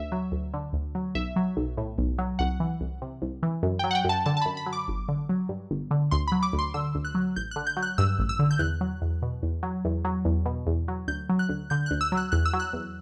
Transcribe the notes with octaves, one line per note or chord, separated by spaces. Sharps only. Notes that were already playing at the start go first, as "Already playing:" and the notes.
Already playing: D2 E5
F#3
D2
D3
D2
F#3
B1 E5
F#3
B1
A2
B1
F#3
C2 F#5
E3
C2
C3
C2
E3
F#2
G5
F#3
F#5
G5
F#2 A5
D3 A5
A5
B5
F#2
B5
F#3
D6
G1
D3
F#3
G2
G1
D3
D2 C6
B5
F#3
D6
D2
C6
D3 E6
D2
F#6
F#3
A1 G6
F#6
D3
G6
F#3
F#6
G2 E6
A1
E6
D3
G6
E2 F#6
F#3
E2
B2
E2
F#3
E2
F#3
E2
B2
E2
F#3
D2 G6
F#3
F#6
D2
D3 G6
F#6
D2
E6
F#3
F#6
E2 F#6
E6
F#3
F#6
E2